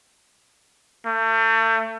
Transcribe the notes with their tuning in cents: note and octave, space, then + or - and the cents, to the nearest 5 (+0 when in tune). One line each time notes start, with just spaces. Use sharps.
A3 +35